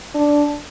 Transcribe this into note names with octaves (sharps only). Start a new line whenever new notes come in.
D4